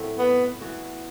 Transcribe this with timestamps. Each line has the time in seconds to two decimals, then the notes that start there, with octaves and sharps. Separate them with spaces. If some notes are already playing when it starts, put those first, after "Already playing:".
Already playing: A2 F#3 A3 C4
0.19 B3
0.61 E3 B3 F#4